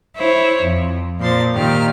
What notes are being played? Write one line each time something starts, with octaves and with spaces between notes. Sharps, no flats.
E4 C5 C#5
F2
A#2 F3 C6 A6
A#2 D#3 G4 F6